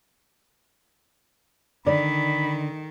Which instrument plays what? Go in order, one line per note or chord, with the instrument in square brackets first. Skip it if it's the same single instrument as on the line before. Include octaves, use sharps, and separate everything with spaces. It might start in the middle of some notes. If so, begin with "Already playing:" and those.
[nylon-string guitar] D3 [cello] D#3 [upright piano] D5 [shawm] B5